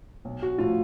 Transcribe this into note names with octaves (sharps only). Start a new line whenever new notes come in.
B1
F#4
A2 F3 F4